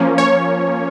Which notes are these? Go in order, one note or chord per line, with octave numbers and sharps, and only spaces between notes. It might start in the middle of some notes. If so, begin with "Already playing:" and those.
Already playing: F3 A#3 C#4
C#5